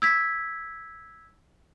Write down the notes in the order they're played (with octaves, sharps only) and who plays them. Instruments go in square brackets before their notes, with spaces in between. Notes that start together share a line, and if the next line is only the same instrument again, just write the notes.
[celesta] E6 G#6 B6